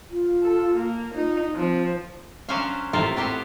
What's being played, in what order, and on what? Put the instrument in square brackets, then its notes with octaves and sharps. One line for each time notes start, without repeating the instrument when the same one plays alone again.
[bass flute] F4
[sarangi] A4
A#3
[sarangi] D#4 [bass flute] F4
[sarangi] F3 [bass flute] C4
[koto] F#3 C#4 D4 C5 E5 F5
A2 C3 E4 F4 A4 A#4
B3 C4 G4 C5 C#5